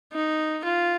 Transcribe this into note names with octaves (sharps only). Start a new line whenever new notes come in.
D#4
F4